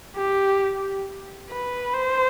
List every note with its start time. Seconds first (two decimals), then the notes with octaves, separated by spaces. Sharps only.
0.16 G4
1.50 B4
1.93 C5